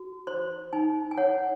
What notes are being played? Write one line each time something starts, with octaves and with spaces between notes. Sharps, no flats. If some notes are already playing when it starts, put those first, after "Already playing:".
Already playing: F#4
C5 C6
D#4 G#5
G#5
C#5 F#5